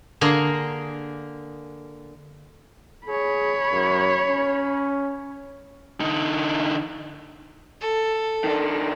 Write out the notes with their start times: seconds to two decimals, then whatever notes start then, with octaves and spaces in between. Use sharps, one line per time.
0.21 D3 A#3 G#4 A#4 G#5 C6
3.07 G#4 C#5 B5
3.72 F#2
4.28 C#4
6.00 D3 D#4
7.81 A4
8.44 D#3 D4